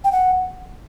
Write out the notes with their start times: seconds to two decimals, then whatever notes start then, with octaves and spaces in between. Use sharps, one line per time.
0.04 G5
0.12 F#5